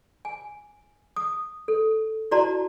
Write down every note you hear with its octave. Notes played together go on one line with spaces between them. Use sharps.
G#5
D#6
A4
E4 F#4 D5 A5 A#5 C6